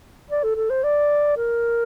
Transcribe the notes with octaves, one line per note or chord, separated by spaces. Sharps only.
D5
A4
A4
C5
D5
A#4